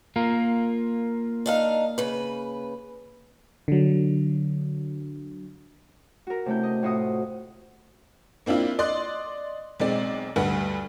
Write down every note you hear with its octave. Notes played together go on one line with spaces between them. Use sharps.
A#3 F4 A#4
D4 D#4 F5
C#3 B4
D3 F#3
F#4 A#4
C3 A3 C#4 E4 G6
D#5
A2 F4 F#4 C5 D#5 D#6
A#3 C4 D4 E4 F4
D5 D#5 C6 D6 F#6
B1 G#3 C4 D5
D2 G2 B4 F#5